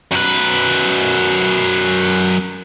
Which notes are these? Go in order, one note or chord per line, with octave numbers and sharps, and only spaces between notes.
F#2 B4